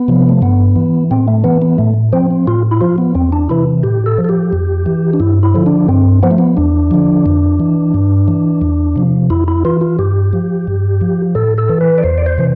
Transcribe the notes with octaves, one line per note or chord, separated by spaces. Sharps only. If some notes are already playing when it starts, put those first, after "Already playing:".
Already playing: B3
C3 F3
A3
G2 B3
E3
A2 C4
A3
E3 B3
B3
A2 A3
F3 C4
C4
A2 F4
E4
F3 F4
B3
E2 C4
D4
C3 E3 E4
A2 G4
A4
F3
A4
G4
F2
E3
D4
G2 E4
E4
D3 F3
D4
G2 C4
F3 B3
A3
B3
E2 D4
D3 F3
F2
E3
G2
E3
E2
C3 F3
F2 E4
E4
E3 F4
F4
G2 G4
F3
G2
F3
A2 A4
A4
E3
B4
D5
E2 C5
D5
C5
C3 E3